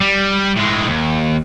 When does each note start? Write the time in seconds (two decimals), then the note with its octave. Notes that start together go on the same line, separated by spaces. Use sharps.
0.01 G3
0.56 A2 G#3
0.88 D#2